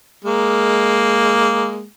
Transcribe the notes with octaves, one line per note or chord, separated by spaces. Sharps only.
G#3 A#3